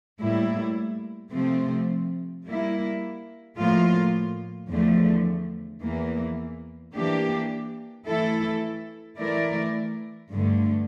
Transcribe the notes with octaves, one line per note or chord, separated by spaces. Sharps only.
A2 G3 A#3 E4
C3 F3 A3 C4
G3 A#3 E4
A2 F3 A#3 F4
E2 D3 F3 A3
E2 E3 A#3
E3 A#3 D4 G4
E3 A3 E4 A4
E3 A3 E4 A#4 D5
G2 D3 A3